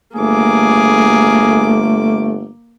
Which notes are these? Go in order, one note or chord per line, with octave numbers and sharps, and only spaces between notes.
G1 A3 A#3 G#4 D6